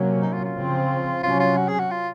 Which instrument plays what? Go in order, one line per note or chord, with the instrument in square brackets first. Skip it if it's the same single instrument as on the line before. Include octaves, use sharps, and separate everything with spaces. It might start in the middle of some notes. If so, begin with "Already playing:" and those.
Already playing: [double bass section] C3 F#3 A#3 C#4
[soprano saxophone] D#4
F4
F4
[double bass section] C#3 F3 C4
[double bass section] C3 F#3 C#4 [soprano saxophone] F4
[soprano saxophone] F4
F#4
G#4
F#4
F4